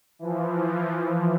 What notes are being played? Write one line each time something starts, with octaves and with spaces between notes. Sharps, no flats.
E3 F3